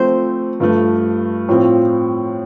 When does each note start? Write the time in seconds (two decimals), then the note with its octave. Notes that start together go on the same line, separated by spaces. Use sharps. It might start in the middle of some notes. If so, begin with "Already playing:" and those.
Already playing: F3 A3 C4 C5
0.60 G2 F3 A3
1.49 A2 F3 C4 F4